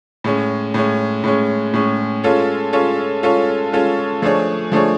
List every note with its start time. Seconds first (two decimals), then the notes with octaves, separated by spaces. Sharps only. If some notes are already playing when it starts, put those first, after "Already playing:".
0.24 A2 G#3 C#4
0.74 A2 G#3 C#4
1.24 A2 G#3 C#4
1.73 A2 G#3 C#4
2.24 G#3 C#4 F4 A4 C#5
2.72 G#3 C#4 F4 A4 C#5
3.23 G#3 C#4 F4 A4 C#5
3.72 G#3 C#4 F4 A4 C#5
4.22 F3 A3 D4 G#4 C#5
4.72 F3 A3 D4 G#4 C#5